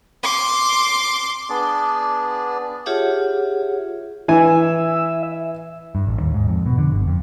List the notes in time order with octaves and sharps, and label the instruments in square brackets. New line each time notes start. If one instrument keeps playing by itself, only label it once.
[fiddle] C6 D6
[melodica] B3 D4 G#4 D5
[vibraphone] F4 G4 G#4 C#5 E5 F#5
[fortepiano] E3 G#5 [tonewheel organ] E5
[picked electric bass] G2
A1
D#2
G#2
F2
B2
D3
G1
F2